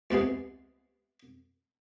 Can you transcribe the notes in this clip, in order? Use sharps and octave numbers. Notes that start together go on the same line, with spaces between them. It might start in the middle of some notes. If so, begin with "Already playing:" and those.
C#2 C3 B3 G#4